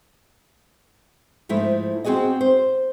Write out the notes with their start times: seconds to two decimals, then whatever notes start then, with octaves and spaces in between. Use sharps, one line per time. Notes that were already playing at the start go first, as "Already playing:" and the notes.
1.49 G#2 F3 A3 E4
2.04 C4 C#4 F#4 G#4 D#5
2.41 C5